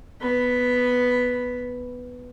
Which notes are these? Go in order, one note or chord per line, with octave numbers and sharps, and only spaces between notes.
B3 B5